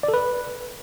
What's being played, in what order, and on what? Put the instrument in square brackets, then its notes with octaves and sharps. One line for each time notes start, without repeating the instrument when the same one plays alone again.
[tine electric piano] D5
A4
B4